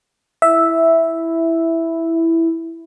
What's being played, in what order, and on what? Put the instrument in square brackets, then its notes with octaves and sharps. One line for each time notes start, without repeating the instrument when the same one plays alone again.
[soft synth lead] E4 [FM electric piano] E5